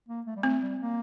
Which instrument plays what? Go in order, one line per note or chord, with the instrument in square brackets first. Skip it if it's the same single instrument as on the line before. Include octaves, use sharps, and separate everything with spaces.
[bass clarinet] A#3
A3
G3
[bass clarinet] A3 [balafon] C4
[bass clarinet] G3
A#3